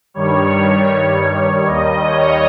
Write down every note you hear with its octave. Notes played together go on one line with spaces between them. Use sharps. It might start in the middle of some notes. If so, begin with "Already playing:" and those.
G2 D#3 G3 C#5
D#2 D#3 G3 D#5
C#5